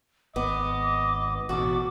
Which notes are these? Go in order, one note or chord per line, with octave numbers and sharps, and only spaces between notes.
G#1 B3 D#5 D6
A1 B2 F#4 A4 D6